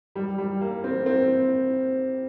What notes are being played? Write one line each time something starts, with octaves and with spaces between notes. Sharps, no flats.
G3
G3
A#3
C4
C4